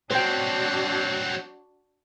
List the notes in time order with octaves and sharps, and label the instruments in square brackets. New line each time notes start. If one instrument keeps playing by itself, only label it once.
[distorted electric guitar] F#3 C4 [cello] D4 F#4 [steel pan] C5 G5